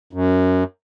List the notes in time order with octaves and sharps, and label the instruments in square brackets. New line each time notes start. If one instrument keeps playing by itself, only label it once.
[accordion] F#2